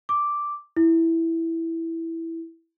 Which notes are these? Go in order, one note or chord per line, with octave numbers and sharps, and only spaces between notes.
D6
E4